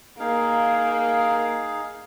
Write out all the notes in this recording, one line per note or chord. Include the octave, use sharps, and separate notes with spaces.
A#3 D#4 G#4 F5